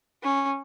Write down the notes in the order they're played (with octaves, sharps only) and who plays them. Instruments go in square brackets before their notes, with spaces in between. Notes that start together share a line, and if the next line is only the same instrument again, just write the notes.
[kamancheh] C#4